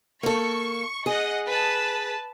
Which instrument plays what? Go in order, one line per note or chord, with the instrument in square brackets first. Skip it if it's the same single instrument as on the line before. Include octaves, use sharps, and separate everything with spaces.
[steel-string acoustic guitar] A#3 A4 [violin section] C#6
[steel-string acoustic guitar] G#4 [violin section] D#5 F#5
[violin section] B4 A5